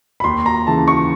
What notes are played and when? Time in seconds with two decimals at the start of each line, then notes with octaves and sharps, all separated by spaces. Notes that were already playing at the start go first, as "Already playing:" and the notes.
0.20 B5
0.24 D#2 C6
0.46 A#5
0.67 C#3 E3 A5
0.88 C#6